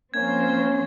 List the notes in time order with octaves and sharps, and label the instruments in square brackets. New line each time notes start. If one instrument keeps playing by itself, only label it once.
[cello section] F3 C4 C5 [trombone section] A#3 C#4 [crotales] G#6